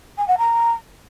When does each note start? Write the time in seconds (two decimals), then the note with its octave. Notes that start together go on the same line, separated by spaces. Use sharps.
0.18 G#5
0.28 F#5
0.38 A#5